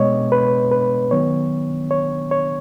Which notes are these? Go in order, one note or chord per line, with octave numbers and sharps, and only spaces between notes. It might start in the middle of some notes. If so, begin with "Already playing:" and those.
Already playing: B2 G#3 B3 C#5 D#5
B4
B4
D#3 F#3 B3 C#5
C#5
C#5